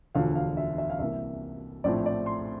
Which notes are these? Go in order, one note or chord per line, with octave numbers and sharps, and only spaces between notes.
E1 D2 D3 F3 F5
F5
E5
E5
F5
C2 C3 E3 A#3 E5
A#1 A2 F3 C4 D5
D5
C6